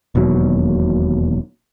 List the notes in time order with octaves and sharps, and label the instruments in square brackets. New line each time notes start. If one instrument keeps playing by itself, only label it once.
[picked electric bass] E1 D#2 B2 F#3